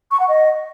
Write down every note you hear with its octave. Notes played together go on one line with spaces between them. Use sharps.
C#6
F#5
D#5